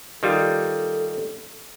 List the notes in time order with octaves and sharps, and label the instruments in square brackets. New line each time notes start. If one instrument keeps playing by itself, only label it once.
[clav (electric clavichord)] D#3 G3 F4 [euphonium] A4